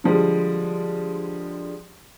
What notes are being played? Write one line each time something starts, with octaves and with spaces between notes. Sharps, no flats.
D3 F3 G3 G#3